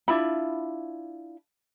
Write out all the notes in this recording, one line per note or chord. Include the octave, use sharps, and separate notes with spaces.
D4 E4 F4 B5